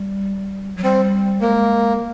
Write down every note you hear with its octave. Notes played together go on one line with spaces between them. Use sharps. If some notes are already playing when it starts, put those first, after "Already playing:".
Already playing: G3
F#3
G3 C4
G#3 A#3